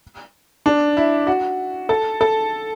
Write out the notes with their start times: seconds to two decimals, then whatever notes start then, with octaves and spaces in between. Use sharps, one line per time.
0.66 D4
0.97 E4
1.27 F#4
1.89 A4
2.21 A4